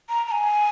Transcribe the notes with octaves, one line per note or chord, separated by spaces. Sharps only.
A#5
A#5
G#5